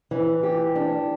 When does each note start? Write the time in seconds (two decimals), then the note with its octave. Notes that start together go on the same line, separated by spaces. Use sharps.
0.11 E3
0.43 G4
0.76 D4